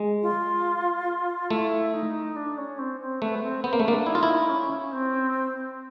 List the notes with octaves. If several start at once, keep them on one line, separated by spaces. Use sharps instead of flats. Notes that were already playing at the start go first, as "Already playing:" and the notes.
Already playing: G#3
F4
A3 E4
D#4
D4
C#4
C4
C4
A3 B3
C4
B3 C4
A#3
A3
A#3 D4
D#4 E4
F4
E4
C#4
C4